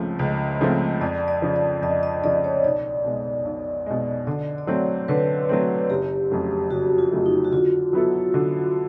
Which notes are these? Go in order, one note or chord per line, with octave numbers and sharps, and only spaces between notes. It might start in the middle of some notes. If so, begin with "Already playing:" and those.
Already playing: C#2 C#3 F3 A3 C4 C5
C#2 D#5
C#3 F3 A3 C4
F2 D5
D5
C#3 F3
D5
F2 D#5
D#5
C#3 F3 D5
C#5
B1 D5
B2 G#3
B1
B2 G#3
D3 D5
D5
F#3 A3 C4 C#5
D3 B4
F#3 A3 C4
F#1 G4
F2 C#3 F#3 A3
F#1 F#4
F4
F2 C#3 F#3 A3
D#4
F#4
D3 F4
F#3 B3 E4 A4
D3